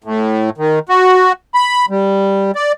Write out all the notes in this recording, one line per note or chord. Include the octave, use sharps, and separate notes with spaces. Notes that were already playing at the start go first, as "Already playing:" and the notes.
A2
D#3
F#4
B5
G3
D5